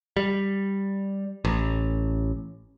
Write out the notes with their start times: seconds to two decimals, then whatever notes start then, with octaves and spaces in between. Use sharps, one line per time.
0.17 G3
1.45 A1